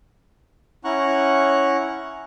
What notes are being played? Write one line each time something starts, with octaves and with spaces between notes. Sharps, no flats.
C#4 E4 F#5 A#5 C#6 F#6